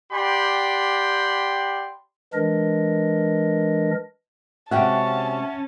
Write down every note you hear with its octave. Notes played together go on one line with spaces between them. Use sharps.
G4 D5 F#5 G5 B5 C6
E3 G#3 D4 A#4 D#5
C3 G#3 C#4 F#4 E5 F#5 G5 A5